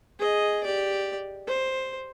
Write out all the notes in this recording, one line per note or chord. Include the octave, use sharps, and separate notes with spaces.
G#4 D#5
G4 D5
C5